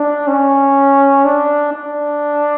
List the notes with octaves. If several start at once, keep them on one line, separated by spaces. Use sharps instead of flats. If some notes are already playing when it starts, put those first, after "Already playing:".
Already playing: D4
C#4
D4
D4